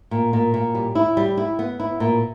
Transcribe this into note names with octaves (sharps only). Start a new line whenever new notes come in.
A#2
A#2
A#2
G3
E4
G3
E4
B3
E4
A#2